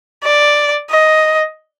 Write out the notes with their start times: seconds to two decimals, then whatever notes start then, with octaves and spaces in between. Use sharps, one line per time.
0.24 D5
0.90 D#5